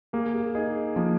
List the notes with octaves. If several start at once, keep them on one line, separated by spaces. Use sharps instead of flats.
A#3 G#4
G#4
D#4 G#4
F3 A#3